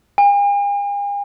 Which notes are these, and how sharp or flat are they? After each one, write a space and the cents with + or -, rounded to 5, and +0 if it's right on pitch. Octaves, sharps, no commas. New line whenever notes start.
G#5 -45